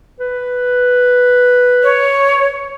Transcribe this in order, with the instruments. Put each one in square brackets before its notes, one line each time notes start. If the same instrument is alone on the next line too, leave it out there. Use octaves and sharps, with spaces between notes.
[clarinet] B4
[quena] C#5